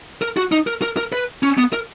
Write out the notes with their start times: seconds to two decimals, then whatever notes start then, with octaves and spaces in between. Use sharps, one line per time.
0.22 A#4
0.37 F#4
0.52 D#4
0.67 A#4
0.82 A#4
0.97 A#4
1.12 B4
1.43 C#4
1.58 B3
1.73 A#4